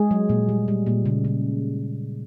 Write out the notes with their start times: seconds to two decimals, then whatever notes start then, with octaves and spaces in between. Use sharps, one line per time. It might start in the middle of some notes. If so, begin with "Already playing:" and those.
Already playing: G#3 G#4
0.11 F#3
0.29 A#2
0.49 G3
0.68 G3
0.87 A#2
1.05 C#3
1.24 C#3